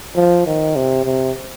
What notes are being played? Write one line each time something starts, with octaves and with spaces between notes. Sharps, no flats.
F3
D#3
C3
C3